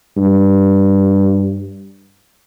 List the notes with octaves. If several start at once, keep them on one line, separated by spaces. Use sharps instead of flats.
G2